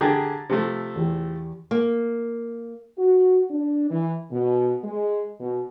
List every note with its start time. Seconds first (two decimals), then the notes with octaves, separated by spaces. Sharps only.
0.01 D3 G4 G#4 A#5 G#6 A6
0.50 C3 F3 A3
0.96 E2 G4
1.71 A#3
2.96 F#4
3.49 D4
3.89 E3
4.30 B2
4.83 G#3
5.40 B2